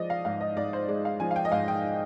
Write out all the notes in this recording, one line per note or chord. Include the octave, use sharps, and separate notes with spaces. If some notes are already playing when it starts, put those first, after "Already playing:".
Already playing: F3 G#3 D5 D#5
F5
G#2 F5
D#5
G#2 D5
C5
G#3 D5
F5
F3 G#5
F5
G5
D#5
G#2 F5
G5